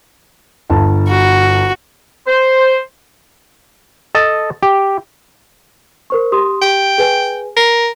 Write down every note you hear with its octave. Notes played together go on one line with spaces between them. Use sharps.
G1 A5
F#4
C5
A4 D#5 A5
G4
A#4 C5 C#6
G4 C6 D#6
G4 G5
G#4 B4 G#5
A#4 C7